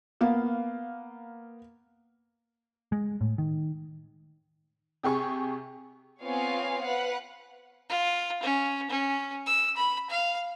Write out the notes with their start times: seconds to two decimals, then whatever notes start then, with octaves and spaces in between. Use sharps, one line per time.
0.21 A#3 B3 F5
2.92 G#3
3.21 A2
3.38 D#3
5.03 C3 G4 G#4 C#6
6.22 B3 C4 F4 C#5 F5 G#5
6.83 B4 F5 F#5
7.89 F4
8.43 C#4
8.90 C#4
9.46 E6
9.76 B5
10.10 F5